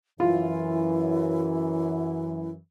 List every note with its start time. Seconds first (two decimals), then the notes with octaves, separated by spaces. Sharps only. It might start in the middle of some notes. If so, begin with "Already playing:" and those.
0.20 F#2 E3 E4 F4